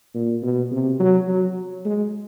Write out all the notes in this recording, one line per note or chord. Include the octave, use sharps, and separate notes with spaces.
A#2
B2
C3
F#3
F#3
G#3